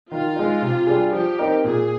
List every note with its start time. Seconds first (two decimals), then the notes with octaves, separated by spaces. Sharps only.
0.11 D#3 F4
0.36 G#3 D#4
0.62 C3
0.87 G3 D4 G#4
1.12 F3 G4
1.39 C4 D#4 A#4
1.64 A#2 G#4